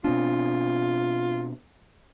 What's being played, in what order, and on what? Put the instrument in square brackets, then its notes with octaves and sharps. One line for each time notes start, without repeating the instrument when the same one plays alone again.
[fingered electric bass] B2 C4 D4 [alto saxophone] F4